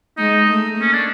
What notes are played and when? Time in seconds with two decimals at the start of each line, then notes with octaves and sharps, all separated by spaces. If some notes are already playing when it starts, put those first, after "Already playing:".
0.17 G#3 D#4
0.48 A3
0.77 A#3 C#4
0.93 D4